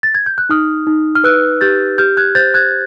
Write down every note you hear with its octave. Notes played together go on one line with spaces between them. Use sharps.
A6
G#6
G6
F#6
D#4 D#6 F6
D#4
F6
B4 E6 F#6
G4 G6 A6
G4 F6 G6
F#6 G#6
C5 G6 A6
F#6 G#6